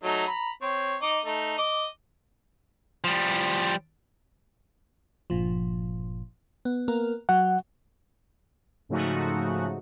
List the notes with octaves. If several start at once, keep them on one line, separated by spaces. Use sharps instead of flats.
F#3 A3 D#4
A#5 B5
C4 C#5
D#4 D#5 D6
A3 D#4
D#5 D6
F3 G3
G1 A#2 F3
B3
A#3 B3 A#4
F#3 F#5
G#2 C#3 F3 A3 D#4 F#4